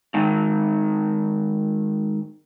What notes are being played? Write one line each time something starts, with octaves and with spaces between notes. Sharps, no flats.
G#2 D#3